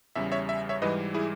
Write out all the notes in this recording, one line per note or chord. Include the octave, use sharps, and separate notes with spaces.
E2 C#3 G3 E5
C#5 E5
E5
C#5 E5
G#2 E3 G3 B4 D#5
E4 G#4